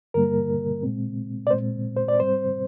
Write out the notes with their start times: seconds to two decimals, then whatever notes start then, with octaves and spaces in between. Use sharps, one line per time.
0.14 G2 D3 G3 A#3 A#4
0.83 A#2 G#3 C4
1.47 D5
1.50 A#2 G#3 C4 C5
1.97 C5
2.08 D5
2.19 G#2 G3 C4 C5